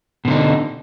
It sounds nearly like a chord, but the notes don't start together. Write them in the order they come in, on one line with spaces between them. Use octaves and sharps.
B2 D3 D#4